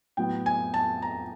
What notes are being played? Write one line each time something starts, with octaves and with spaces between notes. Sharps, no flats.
A2 F#3 B3 G5
G#5
A5
A#5